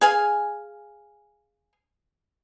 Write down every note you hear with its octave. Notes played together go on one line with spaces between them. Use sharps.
G#4 F5 G#5